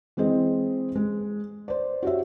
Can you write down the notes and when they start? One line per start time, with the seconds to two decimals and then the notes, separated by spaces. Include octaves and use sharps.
0.17 E3 G#3 C4 G#4 D#5
0.95 G#3
1.68 C5 D5
2.03 F#4 G4 C#5 E5